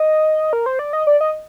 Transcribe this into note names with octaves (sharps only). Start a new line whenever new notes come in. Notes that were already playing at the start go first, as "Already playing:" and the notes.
Already playing: D#5
A#4
C5
D5
D#5
D5
D#5